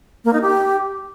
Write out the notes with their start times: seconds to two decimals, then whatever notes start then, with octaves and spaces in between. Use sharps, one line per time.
0.25 A#3
0.33 D#4
0.42 G4